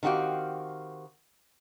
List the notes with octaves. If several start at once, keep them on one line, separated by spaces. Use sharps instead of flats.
D#3 C4 F#4 G4 F5